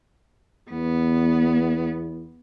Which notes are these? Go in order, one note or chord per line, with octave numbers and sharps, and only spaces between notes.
E2 B3